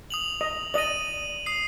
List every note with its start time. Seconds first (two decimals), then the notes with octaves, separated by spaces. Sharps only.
0.10 D#6 F7 F#7
0.41 D#5
0.74 D5 D#5 D#7 F#7
1.46 D#6 C7